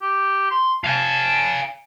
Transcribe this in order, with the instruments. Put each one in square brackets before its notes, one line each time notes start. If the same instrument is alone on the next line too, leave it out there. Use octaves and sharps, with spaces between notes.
[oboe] G4
C6
[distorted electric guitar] F5 G#5 [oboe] A5